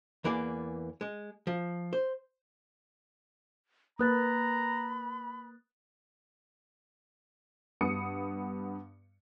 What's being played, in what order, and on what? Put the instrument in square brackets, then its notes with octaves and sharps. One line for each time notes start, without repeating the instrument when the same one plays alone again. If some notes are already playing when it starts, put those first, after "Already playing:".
[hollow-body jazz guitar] E2 E3 A#3 G#4 D5
G#3
F3
C5
[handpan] A#3 B4 [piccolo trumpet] A#5 [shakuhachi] B5 [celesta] D#6 F#6 A6
[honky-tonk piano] G2 B3 D#6 C#7